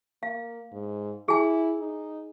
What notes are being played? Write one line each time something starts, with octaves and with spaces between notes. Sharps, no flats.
A#3 F5
G#2
E4 G#4 G#5
D#4